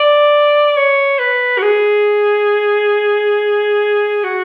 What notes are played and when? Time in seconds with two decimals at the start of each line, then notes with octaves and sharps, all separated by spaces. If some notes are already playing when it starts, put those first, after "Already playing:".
Already playing: D5
0.76 C#5
1.19 B4
1.58 F#4
1.62 G#4
4.24 F#4